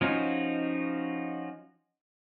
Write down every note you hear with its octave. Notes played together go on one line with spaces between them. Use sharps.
F3 C#4 D#4 F4 F#4